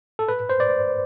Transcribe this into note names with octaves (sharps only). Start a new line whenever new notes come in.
A4
B4
C5
D5